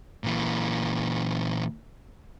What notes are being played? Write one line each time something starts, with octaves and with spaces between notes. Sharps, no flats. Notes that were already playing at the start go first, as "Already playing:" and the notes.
A#2 E3